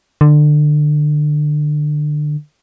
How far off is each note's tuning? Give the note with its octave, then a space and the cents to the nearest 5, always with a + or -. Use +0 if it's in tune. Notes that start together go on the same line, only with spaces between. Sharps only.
D3 +25